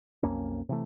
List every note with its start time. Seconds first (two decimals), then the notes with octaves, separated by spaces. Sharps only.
0.23 B1 F2 A#3 C#4
0.69 C3 E3 A3